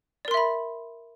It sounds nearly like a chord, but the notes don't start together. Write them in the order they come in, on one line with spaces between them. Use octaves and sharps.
D5 A#4 C6 E5 B5